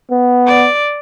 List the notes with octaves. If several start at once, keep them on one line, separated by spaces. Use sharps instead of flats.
B3
D5